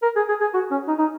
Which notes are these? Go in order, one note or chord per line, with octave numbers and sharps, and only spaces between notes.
A#4
G#4
G#4
G#4
F#4
C#4
D#4
D#4